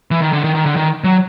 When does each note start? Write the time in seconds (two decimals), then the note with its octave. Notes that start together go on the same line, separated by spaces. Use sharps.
0.11 E3
0.22 D#3
0.33 D3
0.44 D#3
0.55 D#3
0.66 D3
0.76 D#3
1.04 F#3